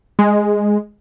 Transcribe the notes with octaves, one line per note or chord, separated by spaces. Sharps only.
G#3